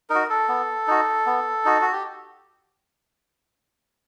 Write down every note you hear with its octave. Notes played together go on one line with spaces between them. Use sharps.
D#4 F#4 A#4
A4
B3
D#4 F#4
B3
D#4 F#4
F#4
G4